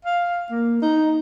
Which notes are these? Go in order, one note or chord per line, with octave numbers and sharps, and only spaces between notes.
F5
A#3
D#4